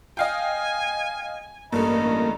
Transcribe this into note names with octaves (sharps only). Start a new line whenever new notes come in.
D#5 F5 G5 G#5
A1 G2 A3 A#3 A4 D#5 A#5